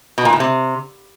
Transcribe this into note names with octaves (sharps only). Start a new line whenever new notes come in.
B2
A#2
A2
C3